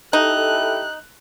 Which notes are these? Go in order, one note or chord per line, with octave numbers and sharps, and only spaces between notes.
D#4 E4 G4 A4 F#6